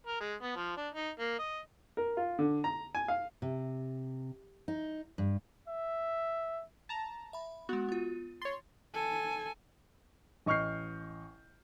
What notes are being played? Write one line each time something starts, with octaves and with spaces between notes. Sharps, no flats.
A#4
G#3
B3
F3
D4
D#4
A#3
D#5
A#4
F4
D3
A#5
G#5
F5
C3
D#4
G2
E5
A5 A#5
E5 B5
G#3 B3 F#4
B3 F4
C#5 C6 A6
A4 G#5
A1 D#5 C#6 F6 G6 C7